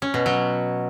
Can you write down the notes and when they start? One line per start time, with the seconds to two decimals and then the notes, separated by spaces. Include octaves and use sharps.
0.02 C#4
0.14 B2
0.26 F#3